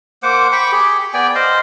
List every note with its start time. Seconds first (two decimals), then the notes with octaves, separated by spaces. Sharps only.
0.23 A#3 C5 F#5 D6
0.52 G5 B5 C#6 D6
0.72 G4 G#4
1.14 B3 D5 G5 G#5
1.35 C5 D#5 F5